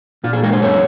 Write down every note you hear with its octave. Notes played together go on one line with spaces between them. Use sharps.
A#2 F4
G#4
G#3 A#4
C5
F#2 C#5